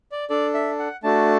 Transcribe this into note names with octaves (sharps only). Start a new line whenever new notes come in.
D5
D4 A4 D5
E5
F#5
A3 D4 F#4 A4 A5